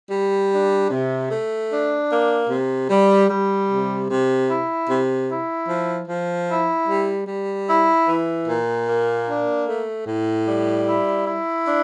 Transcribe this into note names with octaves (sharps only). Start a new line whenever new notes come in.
G3
D4
C3
A3
D4
A#3
C3
G3
G3
C3
C3
E4
C3
E4
F3
F3
E4
G3
G3
E4
E3
A#2
A#3
D4
A3
A2
G3
E4
E4
D4